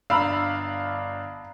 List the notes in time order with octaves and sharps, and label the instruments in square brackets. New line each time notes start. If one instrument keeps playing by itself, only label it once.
[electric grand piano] G1 D4 F5 [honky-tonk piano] A#5 B5 E6